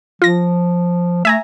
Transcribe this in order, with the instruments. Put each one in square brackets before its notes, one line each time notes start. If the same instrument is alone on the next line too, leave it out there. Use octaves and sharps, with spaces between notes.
[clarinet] F3 [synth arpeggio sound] F4 A#6
[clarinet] A3 [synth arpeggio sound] E5 G#5 A#5